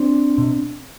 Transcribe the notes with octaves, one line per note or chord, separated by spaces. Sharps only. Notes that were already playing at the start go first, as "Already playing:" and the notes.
Already playing: C4 D4
B2